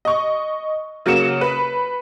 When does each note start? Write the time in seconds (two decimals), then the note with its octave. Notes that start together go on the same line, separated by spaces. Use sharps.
0.05 D#5 C#6
1.06 C#3 F#3 A#3 C#7 E7
1.41 B4